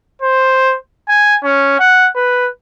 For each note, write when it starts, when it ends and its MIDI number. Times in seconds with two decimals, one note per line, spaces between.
0.22 0.76 72
1.08 1.36 80
1.44 1.75 61
1.79 2.08 78
2.16 2.48 71